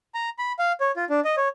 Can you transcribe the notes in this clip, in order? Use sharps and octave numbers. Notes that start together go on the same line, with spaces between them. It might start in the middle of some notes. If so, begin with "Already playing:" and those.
A#5
B5
F5
C#5
F4
D4
D#5
C#5